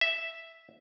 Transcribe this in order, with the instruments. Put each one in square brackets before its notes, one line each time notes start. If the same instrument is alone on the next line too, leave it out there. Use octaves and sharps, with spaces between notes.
[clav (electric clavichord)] E5